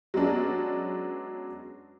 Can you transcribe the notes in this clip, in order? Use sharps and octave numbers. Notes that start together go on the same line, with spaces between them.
F#3 G#3 B3 C#4 D4